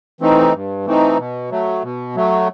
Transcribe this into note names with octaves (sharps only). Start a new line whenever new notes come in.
E3 A3 C4 D#4
G2
E3 A3 C4 D#4
B2
F#3 A3
B2
F#3 A3